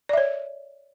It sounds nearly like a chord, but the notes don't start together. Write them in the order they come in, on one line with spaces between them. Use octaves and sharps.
D5 E5 C#5